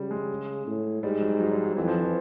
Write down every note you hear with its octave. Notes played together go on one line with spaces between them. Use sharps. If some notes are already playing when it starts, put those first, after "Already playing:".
Already playing: C#3 F#3 G3
G#3
A2
G#2 G3
F#3
F#3
G3
F#3
F2 E3
F3
E3